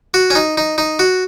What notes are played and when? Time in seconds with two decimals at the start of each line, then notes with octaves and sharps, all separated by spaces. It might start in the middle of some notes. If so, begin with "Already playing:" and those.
0.14 F#4
0.30 C#4
0.35 D#4
0.57 D#4
0.78 D#4
0.99 F#4